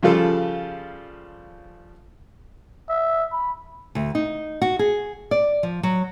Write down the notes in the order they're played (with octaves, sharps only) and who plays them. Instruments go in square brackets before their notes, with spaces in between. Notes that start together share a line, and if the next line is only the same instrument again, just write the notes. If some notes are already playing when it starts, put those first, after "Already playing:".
[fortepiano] C#3 F3 G3 F4 A4
[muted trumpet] E5
B5
[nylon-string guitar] D2
D#4
F#4
G#4
D5
F3
F#3